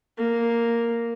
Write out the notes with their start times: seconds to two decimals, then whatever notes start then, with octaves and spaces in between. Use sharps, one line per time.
0.18 A#3